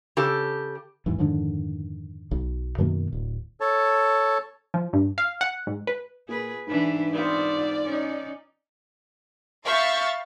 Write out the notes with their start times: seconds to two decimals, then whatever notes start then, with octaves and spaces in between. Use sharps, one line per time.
0.17 C#3 G4 A4
1.06 E2 G#2 E3
1.18 F2 G#2 D3 D#3
2.31 B1
2.78 F#2 B2 D#3 A#3
3.12 D1
3.60 A4 C#5 A5
4.74 F3
4.93 G2
5.18 F5
5.41 F#5
5.67 G#2
5.87 B4
6.28 A#2 G#4 B4
6.67 G#2 E3 D4 B4
7.13 B3 C4 F4 D5
7.84 C#4 D#4
9.64 E5 F5 B5 C#6 G6 A6